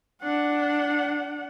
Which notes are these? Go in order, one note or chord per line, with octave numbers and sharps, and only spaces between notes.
D4 F#5